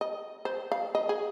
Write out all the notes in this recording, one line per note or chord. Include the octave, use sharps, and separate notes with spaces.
D#5
C5
F5
D#5
G#4